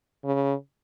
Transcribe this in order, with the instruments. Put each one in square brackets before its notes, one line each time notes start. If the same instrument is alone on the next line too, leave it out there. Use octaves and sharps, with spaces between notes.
[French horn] C#3